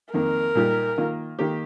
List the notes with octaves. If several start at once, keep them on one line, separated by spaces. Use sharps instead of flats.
F2 D#3 A#3 A#4
A#2 G3 D#4 G4
D#3 A#3 F4
D#3 A#3 G4